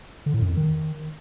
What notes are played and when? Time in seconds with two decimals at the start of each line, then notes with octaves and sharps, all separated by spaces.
0.26 D3
0.34 A2
0.41 F#2
0.49 F2
0.57 D#3